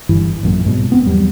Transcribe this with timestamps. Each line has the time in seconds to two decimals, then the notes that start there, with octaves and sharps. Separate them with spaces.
0.09 G1 G2 E3
0.43 A1 F#2 A#2
0.65 C2 G#2 B2
0.92 B3 C4
1.06 E2 F#3 G3